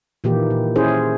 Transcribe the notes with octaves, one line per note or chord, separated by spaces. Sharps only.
A#2 D#3 E3 A#3 G4
A#2
C#4 E4 G#4 C5